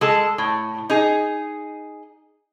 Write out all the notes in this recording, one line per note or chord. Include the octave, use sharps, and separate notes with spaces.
G#3 A4
A2
D#4 G#4